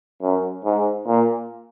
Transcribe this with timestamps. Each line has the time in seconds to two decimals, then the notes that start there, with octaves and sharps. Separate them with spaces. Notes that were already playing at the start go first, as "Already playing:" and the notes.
0.22 F#2
0.65 G#2
1.07 A#2